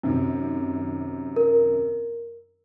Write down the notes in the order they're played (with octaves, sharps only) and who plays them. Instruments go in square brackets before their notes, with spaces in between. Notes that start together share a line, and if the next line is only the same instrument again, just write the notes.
[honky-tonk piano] F#2 C3 D#3
[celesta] A#4